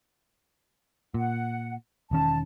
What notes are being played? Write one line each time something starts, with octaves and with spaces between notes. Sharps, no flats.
A#2 F#5
E1 D#3 C#4 A5